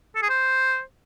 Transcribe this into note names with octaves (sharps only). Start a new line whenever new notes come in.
A4
G#4
C5